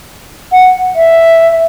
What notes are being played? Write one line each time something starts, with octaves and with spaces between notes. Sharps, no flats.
F#5
E5